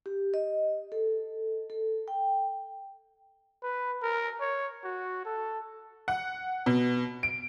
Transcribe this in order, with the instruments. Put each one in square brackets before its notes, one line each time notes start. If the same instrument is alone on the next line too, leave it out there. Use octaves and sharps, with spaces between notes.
[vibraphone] G4
D#5
A4
A4
G5
[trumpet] B4
A#4
C#5
F#4
A4
[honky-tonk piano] F#5
B2
D7